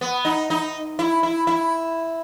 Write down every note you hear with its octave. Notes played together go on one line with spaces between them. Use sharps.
B3
D#4
D#4
E4
E4
E4